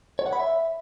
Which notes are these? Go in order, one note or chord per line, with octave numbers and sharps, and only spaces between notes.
C#5
F#5
B5
E5